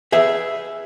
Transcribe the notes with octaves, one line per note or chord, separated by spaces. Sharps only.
G#4 B4 E5